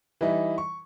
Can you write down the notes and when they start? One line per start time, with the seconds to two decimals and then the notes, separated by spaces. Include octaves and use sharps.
0.21 E3 G3 D#4 E4
0.58 C#6